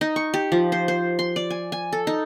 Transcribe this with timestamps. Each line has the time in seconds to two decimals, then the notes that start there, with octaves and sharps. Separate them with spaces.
0.01 D#4
0.16 C#6
0.34 G4
0.52 F3
0.72 C5
0.88 C5
1.19 C6
1.36 D5
1.50 G#5
1.72 G#5
1.93 A4
2.07 D#4